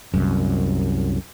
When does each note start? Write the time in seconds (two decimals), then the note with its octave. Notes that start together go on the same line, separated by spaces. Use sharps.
0.14 C2 F#2